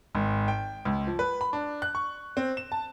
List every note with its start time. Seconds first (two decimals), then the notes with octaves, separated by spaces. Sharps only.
0.15 G#1
0.48 G5
0.85 C#2
1.07 F3
1.19 B4
1.41 B5
1.53 D4
1.82 F#6
1.95 C#6
2.37 C4
2.57 E7
2.72 A5